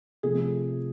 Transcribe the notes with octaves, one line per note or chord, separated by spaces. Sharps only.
C3 F3 A3 G#4